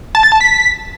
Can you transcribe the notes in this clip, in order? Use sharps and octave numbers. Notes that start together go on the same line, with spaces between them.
A5
A6
A5
B6